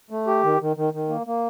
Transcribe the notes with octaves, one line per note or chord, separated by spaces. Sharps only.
A3
G4
D#3
D#3
D#3
D#3
A#3
A#3